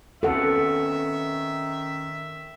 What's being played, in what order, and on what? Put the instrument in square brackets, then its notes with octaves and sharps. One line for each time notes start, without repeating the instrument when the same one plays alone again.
[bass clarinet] D#3 [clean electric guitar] C4 C#4 B4 [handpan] A4 F#5 [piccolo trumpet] E5